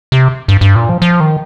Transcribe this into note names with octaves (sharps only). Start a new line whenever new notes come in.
C3
G2
G2
A#2
F3
F3
D#3